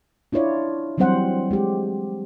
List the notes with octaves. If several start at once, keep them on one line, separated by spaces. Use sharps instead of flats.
D4 E4 F4 C#5 D5
E3 F#3 G3 C4 C5 F#5
G#3 G4